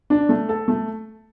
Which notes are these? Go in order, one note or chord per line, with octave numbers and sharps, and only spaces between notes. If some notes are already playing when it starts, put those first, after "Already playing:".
D4
A3
A4
A3